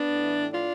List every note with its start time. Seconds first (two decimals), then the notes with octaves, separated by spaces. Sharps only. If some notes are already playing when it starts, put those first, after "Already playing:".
Already playing: B3 D4
0.09 A2
0.24 E3
0.39 A2
0.53 D4 F4